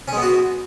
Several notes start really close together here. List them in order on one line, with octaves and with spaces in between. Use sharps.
C#4 G#3 B3 F#4